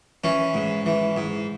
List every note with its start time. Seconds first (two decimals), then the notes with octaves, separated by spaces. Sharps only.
0.24 E3 C#4
0.54 G#2
0.86 E3
1.17 G#2